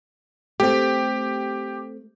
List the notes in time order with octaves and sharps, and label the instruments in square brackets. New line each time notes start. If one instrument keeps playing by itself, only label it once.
[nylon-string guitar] A3 C4 [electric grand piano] G4